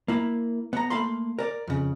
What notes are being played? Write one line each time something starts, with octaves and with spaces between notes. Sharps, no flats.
A#3 E4
B3 A#5
A3 A#3 F5 B5 C6
A#4 D5
F2 C#3